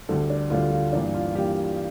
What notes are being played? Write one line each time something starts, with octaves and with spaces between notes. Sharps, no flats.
D2 D3 G3 A4
D4
D2 D3 G3 F4
F4
G2 E3 A#3 D4
F4
G2 E3 A#3 G4